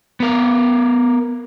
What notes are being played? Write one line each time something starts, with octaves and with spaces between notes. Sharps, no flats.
B3 A#4